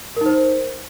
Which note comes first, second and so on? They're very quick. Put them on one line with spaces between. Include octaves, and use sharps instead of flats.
A#4 D#4 C5